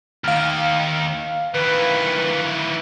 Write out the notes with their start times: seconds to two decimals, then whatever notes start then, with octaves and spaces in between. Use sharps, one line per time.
0.24 D#2 D#3 F5 F6
1.54 D#3 E3 B4